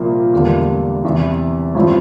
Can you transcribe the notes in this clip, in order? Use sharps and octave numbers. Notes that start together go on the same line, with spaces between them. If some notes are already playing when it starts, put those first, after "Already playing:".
Already playing: C2 A#2 F3 A#3 F4
E1 E2 D3 G3 A#3
E2 C3 E3
A1 G2 F3 C4 E4